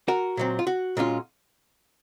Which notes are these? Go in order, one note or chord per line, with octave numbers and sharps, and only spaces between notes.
F#4 A#4
A#2 F#3 C4
F4
F#4
A#2 G#3 C#4 F4